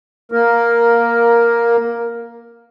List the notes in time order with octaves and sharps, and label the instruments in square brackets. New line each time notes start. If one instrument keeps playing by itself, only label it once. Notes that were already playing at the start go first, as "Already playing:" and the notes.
[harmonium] A#3 A#4